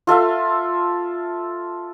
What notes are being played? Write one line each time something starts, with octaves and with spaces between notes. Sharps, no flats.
F4 A4 E5 F5